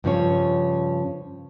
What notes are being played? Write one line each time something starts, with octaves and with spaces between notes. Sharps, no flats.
G2 C#3 F3 C#4 C#5